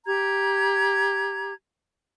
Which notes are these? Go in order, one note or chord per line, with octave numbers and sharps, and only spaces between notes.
G4 A#5 G#6